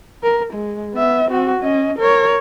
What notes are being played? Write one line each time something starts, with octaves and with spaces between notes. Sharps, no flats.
A#4
G#3
B3 E5
C4 F#4
C#4 D#5
A#4 C#5